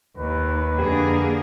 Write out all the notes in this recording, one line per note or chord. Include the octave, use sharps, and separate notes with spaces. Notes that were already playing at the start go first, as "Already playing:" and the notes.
D#2 B4
F2 D3 A#3 G4 G#4